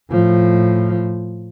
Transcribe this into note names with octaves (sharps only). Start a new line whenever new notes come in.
A2 F3